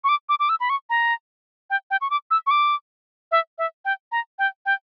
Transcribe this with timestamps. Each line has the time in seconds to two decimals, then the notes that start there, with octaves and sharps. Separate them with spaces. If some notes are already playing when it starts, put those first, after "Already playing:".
0.04 C#6
0.09 D6
0.29 D6
0.40 D6
0.49 E6
0.60 B5
0.70 C#6
0.90 A#5
1.70 G5
1.91 G5
2.01 C#6
2.10 D6
2.31 E6
2.47 C#6
2.51 D6
3.31 E5
3.58 E5
3.85 G5
4.12 A#5
4.39 G5
4.66 G5